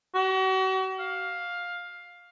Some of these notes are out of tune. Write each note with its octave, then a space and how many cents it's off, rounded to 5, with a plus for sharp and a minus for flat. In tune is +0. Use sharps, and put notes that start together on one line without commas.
F#4 +40
F5 +10